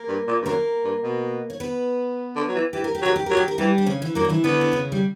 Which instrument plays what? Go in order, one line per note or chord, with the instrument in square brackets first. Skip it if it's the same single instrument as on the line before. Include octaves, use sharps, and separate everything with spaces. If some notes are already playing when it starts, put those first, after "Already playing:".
Already playing: [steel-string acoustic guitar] A#3 A#4
[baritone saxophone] G2
A#2
G2
[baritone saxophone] F#2 [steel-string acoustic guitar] A#3 A#4
[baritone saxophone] G2
B2
[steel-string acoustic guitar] C#5
B3 B4
[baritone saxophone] D3
F#3
E3
[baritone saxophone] E3 [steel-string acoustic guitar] G4
[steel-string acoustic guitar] A#4
G4
[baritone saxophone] F#3
[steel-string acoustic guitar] A#4
G4
[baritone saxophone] F#3 [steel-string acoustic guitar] A#4
[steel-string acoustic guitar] G4
A#4
[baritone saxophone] E3 [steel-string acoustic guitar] G3 G4
[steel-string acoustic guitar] D4
C#3 C#4
E3
[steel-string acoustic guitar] F#2 F#3 [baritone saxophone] A#3
[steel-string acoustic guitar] D4
E3 E4
[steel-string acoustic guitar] D3 D4 [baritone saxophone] B3
[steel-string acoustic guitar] D4
C#3 C#4
G3